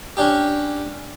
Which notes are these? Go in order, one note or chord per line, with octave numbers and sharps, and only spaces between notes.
C#4 D4 G4